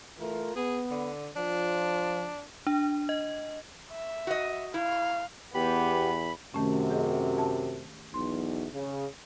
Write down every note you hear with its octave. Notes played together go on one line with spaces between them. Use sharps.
E3 A3 F4 A#4
B3 G#4
D3
F3 D4
D4
D#5
E5
F#4 D#5
E4 F5
E2 B3 G4 B5
F#2 C3 D#3 A3 C#4
G4 G#4 D#5
A5
B1 E2 C6
C#3